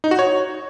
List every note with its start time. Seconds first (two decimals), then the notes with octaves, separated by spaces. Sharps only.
0.04 D#4
0.11 F#4
0.19 C#5